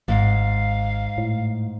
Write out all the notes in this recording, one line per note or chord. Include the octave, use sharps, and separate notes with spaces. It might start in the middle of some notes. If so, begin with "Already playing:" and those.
G#1 G#2 F5
A2